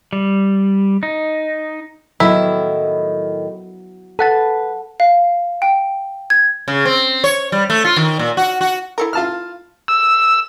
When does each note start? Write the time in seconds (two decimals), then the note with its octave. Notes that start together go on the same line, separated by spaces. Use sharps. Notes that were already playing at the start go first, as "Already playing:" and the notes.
0.13 G3
1.03 D#4
2.20 A2 D#3 F#3 B3 E4
4.19 A4 B4 F#5 A5 B6
5.00 F5
5.62 G5
6.30 G#6
6.68 C#3
6.85 C4
7.24 C#5
7.52 G3
7.70 A3
7.85 F4
7.96 D#3
8.19 A#2
8.37 F#4
8.61 F#4
8.98 E4 A4 A#4
9.13 F4 A5 F6
9.88 E6